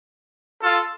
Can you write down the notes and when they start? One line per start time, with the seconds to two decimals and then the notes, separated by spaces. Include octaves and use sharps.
0.62 F4 A4